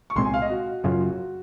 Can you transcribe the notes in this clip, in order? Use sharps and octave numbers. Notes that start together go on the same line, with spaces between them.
C#6
C2 A#2 G#3 C4 C6
G#5
F5
D#5
F#4
F#1 F#2 C#3 F#3 F4
F#4